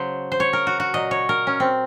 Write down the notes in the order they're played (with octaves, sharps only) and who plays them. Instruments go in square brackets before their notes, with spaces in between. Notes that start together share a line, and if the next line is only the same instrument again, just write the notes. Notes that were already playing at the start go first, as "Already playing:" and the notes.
Already playing: [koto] C#3 F#3 C5
C5
C#5
A#4
F#4
F#4
A#2 F#3 D#5
C#5
A#4
C#4
C4